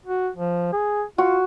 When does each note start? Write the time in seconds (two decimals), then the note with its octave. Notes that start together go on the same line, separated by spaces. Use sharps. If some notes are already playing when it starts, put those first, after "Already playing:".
0.06 F#4
0.36 F3
0.73 G#4
1.18 F4 F#4